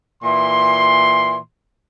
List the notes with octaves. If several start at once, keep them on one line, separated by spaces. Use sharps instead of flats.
A#2 E3 C6